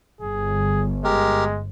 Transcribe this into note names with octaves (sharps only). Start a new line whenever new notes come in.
G1 G#4
G#3 G4 A#4